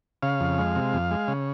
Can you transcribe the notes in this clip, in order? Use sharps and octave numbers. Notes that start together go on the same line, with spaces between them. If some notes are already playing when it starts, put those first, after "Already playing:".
C#3 F5
F2
G#3
C3
F2
G#3
C#3